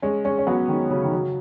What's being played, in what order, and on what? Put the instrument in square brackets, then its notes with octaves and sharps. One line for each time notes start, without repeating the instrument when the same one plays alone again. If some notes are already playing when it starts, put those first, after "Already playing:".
[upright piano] G#3 C#4
G#3 C#4
C#4
F#3 B3
D#3 G#3
C#3 F#3
D#3
C#3 F#3